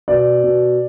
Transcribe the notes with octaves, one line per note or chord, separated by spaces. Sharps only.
B2 D5
B2